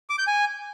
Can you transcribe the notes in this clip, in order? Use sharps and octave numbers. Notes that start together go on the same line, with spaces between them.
D6
G6
G#5